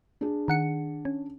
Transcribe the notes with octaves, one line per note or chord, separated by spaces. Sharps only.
D4 G#4
D#3 F#5 C#7
C#4